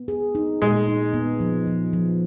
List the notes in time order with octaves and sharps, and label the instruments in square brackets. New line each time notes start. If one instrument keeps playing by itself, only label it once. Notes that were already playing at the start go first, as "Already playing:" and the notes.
Already playing: [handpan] B3
G#4
D#4
[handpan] A#2 [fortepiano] G#3
[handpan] D#4
B3
F3
F3
F3